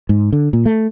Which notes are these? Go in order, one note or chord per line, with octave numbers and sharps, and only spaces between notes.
G#2
D3
A#2
A3